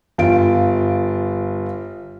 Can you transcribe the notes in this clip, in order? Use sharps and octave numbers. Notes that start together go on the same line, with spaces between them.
G1 F4 D7